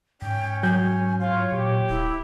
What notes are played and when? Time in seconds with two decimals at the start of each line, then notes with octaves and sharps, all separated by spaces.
0.22 G#2 C#4 G5
0.63 F#3 G#5 G6
1.20 F4 C#5
1.52 A#2 G4
1.89 D1 E4